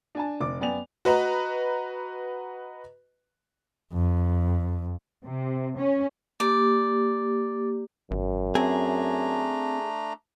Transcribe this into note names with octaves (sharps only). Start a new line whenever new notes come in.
D4 G#5 A5
F1 D5 D6
F#2 B3 D5 G5 G#5 F7
F#4 B4 D#5 A#5
F2
C3
C#4
A#3 G4 D5
G#1 F#2
A3 C4 D4 G#4 A#5